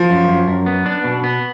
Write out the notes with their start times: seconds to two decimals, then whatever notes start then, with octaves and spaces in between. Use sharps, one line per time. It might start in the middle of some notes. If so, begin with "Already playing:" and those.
Already playing: F3
0.10 F#2
0.28 F#2
0.48 F#2
0.66 B3
0.86 D4
1.04 B2
1.24 B3